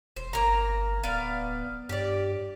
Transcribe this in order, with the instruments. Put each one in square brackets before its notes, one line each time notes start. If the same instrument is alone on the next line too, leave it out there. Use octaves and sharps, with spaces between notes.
[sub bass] E1 [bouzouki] C5
[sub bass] G1 [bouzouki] A#3 A#5
[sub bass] D1 [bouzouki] B3 D5 F5
[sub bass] G2 [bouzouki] G4 D5